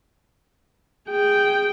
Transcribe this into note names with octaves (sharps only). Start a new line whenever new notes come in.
G#4 G5